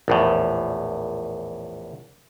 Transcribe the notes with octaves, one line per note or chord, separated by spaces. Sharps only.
A#1 E2 A2